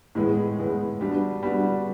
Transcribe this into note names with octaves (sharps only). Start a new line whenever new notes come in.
A2 E3 G#3 B3
A2 E3 G#3 B3
G3 B3 D4 F#4
G3 B3 D4 F#4